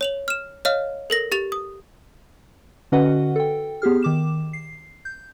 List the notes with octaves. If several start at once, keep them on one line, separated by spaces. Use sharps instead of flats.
C#5 F7 F#7
F6 E7
C#5 D#5 F5 F6
A4 A#4 A#6
G4 A6 F7
D#6
D3 C#4 F#4 B4 D#5 F#5
A4 G5
B3 G4 G#4 F6
D#3 D6 E7
C7
G6